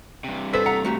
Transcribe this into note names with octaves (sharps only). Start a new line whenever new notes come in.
G2 C3
A4 B4 C5 E5 B6
F#5 A#5
A3 F#4 G4